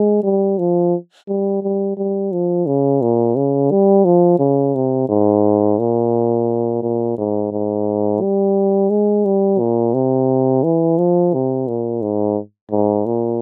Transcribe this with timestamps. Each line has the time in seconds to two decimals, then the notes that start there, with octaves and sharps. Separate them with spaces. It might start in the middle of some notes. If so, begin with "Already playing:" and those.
Already playing: G#3
0.23 G3
0.58 F3
1.28 G3
1.63 G3
1.97 G3
2.32 F3
2.66 C#3
3.02 A#2
3.36 C#3
3.71 G3
4.05 F3
4.39 C#3
4.75 C3
5.09 G#2
5.79 A#2
6.82 A#2
7.18 G#2
7.52 G#2
8.21 G3
8.90 G#3
9.25 G3
9.59 A#2
9.94 C3
10.63 E3
10.98 F3
11.34 C3
11.67 A#2
12.02 G#2
12.71 G#2
13.06 A#2